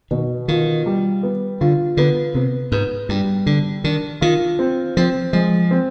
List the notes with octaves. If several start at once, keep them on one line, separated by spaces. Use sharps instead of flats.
B2 D#3
D#3 F4
G3
B3
D3 F4
D3 B3
C3 B3
G#2 B3
G2 G3
D3 D4
D#3 D4
D#3 F4
C4
F3 C4
F3 G#3
C4